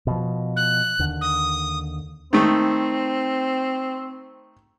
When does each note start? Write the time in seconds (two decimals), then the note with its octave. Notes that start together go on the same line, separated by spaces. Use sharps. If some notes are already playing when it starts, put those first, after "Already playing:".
0.07 B2 F3
0.57 F#6
0.99 D#2 D3
1.21 D#6
2.33 D#3 A3 C4